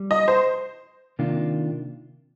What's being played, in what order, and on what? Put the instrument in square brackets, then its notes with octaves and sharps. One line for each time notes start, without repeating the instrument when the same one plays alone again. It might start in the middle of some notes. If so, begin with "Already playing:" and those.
Already playing: [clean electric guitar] G3
[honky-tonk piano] D#5
C5
[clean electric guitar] C3 D#3 A#3 D4 F4